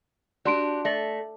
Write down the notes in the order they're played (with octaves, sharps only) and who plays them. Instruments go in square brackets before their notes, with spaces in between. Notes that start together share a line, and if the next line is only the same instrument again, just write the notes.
[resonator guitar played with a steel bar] D4 F#4 G4 [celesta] D5 C6 D7
[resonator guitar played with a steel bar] A3 [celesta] D5 A#6 F#7